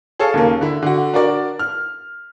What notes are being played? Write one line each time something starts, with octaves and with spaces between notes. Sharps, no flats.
G#4 A4 C#5 F5 A5
D#2 C#3 A#3
D3 E4
D3 F#4
D4 F#4 A#4 D5
F6